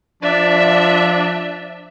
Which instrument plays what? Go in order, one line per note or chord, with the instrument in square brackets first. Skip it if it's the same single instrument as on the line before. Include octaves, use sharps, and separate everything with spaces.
[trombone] F3 [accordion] D4 D5 [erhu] E5